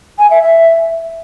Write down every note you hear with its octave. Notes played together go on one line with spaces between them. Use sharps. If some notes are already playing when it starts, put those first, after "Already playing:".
G#5
E5
E5